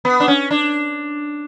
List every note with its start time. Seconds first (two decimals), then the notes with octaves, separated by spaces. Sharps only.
0.05 B3
0.20 D4
0.28 C#4
0.51 D4